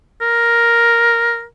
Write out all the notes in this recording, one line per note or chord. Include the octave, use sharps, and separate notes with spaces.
A#4